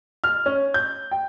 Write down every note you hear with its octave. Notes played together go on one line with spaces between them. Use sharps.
F6
C#4
G6
G5